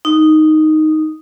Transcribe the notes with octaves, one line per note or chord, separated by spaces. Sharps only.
D#4